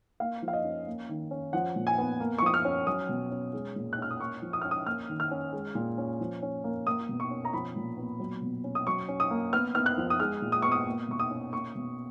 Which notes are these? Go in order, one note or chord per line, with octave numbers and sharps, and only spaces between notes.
A#3 F5
F3
F5
D#5
C#4
A#3
D#3
C#4
F3 F#5
A#2
G#5
B3
A#3
C#6
F3 D#6
F6
C#4
F#3 D#6
B2
C#4
G#3
A#2
F#6
C#4 F6
D#6
A#3 C#6
F3
D#6
C#4 F6
D#6
A#3 F6
D#3
F6
C#4
G#3
A#2
C#4
F3
C#4
A#3
A#3 D#6
B2
C#6
C#4
A#5
F3 B5
A#2
B3
F#3
B2
C#4
D#6
F#3 C#6
C#4
D#6
A#3
B3 F6
B3 F6
F#6
F3
D#6
G#3 F6
A#2
D#6
B3 C#6
D#6
A#3
B2 C#6
D#6
C#4
A#3 C#6
B2